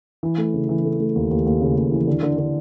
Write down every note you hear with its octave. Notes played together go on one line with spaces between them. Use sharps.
E3
A3
C#3
E3
A3
A3
D#2
D#2
D#2
C#3
D#2
E3
D3
D3
D3